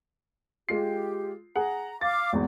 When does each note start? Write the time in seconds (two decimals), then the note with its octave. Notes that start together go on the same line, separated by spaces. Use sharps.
0.69 G#3 F4 G4 C7
1.56 G#4 F#5 A#5
2.01 F5 D6 A6
2.33 G#1 E2